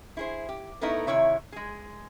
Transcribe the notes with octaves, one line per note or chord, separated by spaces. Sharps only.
E4 G#4 C5
G4
A3 B3 D#4 E4 A4 A#4
C3 D#3 E4 C#5 E5
G#3 G#4